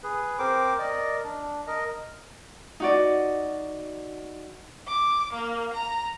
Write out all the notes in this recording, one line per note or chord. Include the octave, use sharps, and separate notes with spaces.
G#4 B4
C4 A#4 C5 D6
A#4 D5 D#5
D4
A#4 D#5
D#4 F#4 D5
D6
A#3
A#5